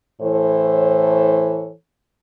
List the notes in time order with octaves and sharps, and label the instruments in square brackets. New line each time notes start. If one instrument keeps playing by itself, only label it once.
[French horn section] A2 E3 A4 C5 C#5